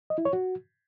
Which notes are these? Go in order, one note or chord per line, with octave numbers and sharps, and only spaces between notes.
D#5
E4
C#5
F#4